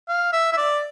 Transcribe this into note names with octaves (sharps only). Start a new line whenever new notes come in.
F5
E5
E5
D5